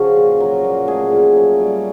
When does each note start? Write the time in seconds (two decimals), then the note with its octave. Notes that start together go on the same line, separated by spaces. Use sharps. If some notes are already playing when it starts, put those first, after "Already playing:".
Already playing: C#3 F3 C#4 F#4
0.17 A#2
0.40 F#3
0.64 A#2
0.87 A3 G#4
1.12 A#2
1.36 F#3
1.60 G3